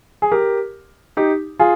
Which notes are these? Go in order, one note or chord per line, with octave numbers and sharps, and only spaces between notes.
G#4
G4 A#4
D#4 G4
F4 G#4